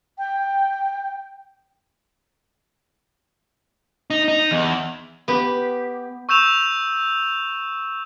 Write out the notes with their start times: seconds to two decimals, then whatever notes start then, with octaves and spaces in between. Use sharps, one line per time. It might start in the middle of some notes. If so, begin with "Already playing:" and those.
0.18 G5
4.10 D#4
4.28 D#4
4.51 E2
5.28 B3 G4
6.29 C#6 E6 G6 E7 F7